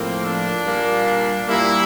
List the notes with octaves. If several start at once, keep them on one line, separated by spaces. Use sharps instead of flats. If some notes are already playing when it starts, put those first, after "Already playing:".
Already playing: A2 F3 A#3 C4
D4
A#2 G3 A#3
D4
A#2 G3 A#3 E4